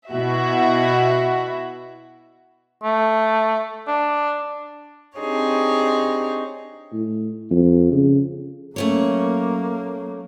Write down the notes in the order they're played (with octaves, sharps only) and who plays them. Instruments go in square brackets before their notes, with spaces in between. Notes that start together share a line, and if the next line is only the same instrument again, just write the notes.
[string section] B2 E4 F#4 E5
[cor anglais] A3
D4
[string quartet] C4 D4 D#4 G4 G#4 C#5
[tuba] A2
F2
C#3
[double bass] F#3 A#3 [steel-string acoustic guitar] A3 C#4 C#5